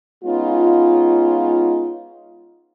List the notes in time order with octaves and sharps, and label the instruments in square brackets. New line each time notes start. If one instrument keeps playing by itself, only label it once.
[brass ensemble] G#3 B3 C#4 D#4 F4